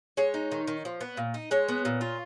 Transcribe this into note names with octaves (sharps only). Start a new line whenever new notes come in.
G#3 C#5
D#4
D#3
D#3
F3
B3
A#2
D#4
G#3 C#5
B3
A#2
F4